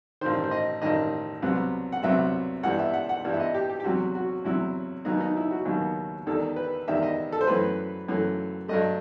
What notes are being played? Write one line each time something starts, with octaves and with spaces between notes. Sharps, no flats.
A1 G2 D#3 C5
C5
D#5
A1 G2 D#3 D#5
C2 C3 F#3 B3
F#5
C2 C3 F#3 B3 E5
G2 E3 G3 B3 F#5
E5
F#5
F#5
G2 E3 G3 B3
E5
D#5
G4
G4
G4
E2 C3 F#3 F#4
F#4
E2 C3 F#3 E4
D#2 D#3 F#3 B3 D#4
D#4
E4
F#4
D#2 D#3 F#3 B3
E2 D#3 G3 A4
B4
E2 D#3 G3 E5
D#5
A4
C5
F#2 E3 A3 B4
F#2 E3 A3
G2 F#3 A3 D#5